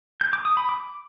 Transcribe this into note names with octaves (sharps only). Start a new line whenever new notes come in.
G6
D6
D#6
B5
D6